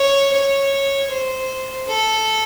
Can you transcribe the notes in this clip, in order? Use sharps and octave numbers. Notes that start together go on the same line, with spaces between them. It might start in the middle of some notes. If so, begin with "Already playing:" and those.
Already playing: C#5
C#5
C5
A4